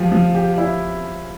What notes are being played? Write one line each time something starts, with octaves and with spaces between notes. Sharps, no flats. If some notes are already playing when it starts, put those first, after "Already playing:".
Already playing: F3 G4
F3
G4
E4